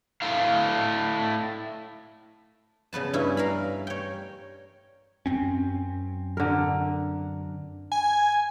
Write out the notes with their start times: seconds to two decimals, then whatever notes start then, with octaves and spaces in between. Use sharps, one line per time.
0.22 A3 E4 F5
2.93 C#3 B3 B4 A5
3.13 G2 C#4 E4
3.37 A#4 F5 B5
3.87 C#5 G5
5.26 F#2 C4 C#4
6.37 D3 A#4
7.92 G#5